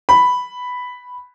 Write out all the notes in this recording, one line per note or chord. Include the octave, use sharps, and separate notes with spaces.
B5